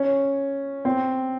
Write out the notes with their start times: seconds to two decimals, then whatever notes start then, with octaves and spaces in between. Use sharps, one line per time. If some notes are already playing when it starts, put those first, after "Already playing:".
Already playing: C#4
0.85 C4